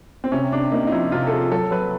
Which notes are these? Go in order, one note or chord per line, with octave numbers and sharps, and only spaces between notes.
C4
C3 C#4
C3 D4
A#3 D#4
D#4
F3 E4
C3 F4
A4
C3 G#4
F#3 A4
F#3 B4